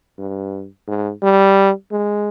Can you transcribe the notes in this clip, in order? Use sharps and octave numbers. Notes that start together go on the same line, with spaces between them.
G2
G#2
G3
G#3